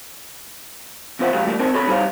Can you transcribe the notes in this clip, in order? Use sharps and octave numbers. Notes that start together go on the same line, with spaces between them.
E2 C3 F4 C5 E5 F#5
A#2 F3 G#3 F#4 G4 F5
E3 F3 G3 A3 A#3
C4 D#4 A#4 C5 A5
C4 F#4 A4 C#5 A5 B5
G3 D#4 G4 C5 C#5 F5